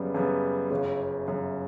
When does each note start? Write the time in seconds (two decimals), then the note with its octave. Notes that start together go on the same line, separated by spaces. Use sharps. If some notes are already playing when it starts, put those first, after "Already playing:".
Already playing: F#2 C#3 G3 B3
0.14 F#2 C#3 G3 B3
0.70 G1 F#2 C#3
1.27 G1 F#2 C#3